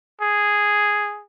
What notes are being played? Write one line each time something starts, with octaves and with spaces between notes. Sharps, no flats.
G#4